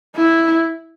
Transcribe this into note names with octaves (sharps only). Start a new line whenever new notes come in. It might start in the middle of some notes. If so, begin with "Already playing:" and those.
E4